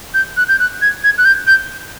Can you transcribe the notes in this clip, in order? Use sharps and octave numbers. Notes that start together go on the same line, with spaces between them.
G6
F#6
G6
F#6
G#6
G#6
F#6
G6
G6